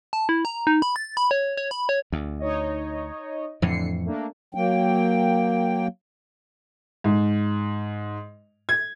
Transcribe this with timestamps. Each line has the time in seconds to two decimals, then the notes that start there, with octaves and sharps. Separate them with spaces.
0.13 A5
0.29 E4
0.45 A#5
0.67 D#4
0.82 B5
0.96 A6
1.17 B5
1.31 C#5
1.57 C#5
1.71 B5
1.89 C#5
2.12 D2
2.40 D#4 C#5 D#5
3.62 F2 A2 D3 E3 C7 C#7
4.06 A3 A#3 D4
4.55 F#3 A#3 G5
7.04 G#2
8.69 G#6